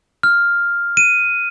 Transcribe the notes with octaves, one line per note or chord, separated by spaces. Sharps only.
F6
D#7